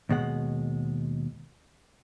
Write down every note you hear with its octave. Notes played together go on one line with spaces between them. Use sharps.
D#2 B2 G#3 F#5